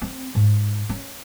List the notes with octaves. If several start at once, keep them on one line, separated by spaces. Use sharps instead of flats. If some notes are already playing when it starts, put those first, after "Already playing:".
C4
G#2
C#4